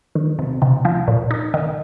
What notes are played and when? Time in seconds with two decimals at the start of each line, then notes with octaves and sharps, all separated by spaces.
0.15 D#3
0.39 C3
0.62 C3
0.85 F3
1.08 A#2
1.31 D#4
1.54 D#3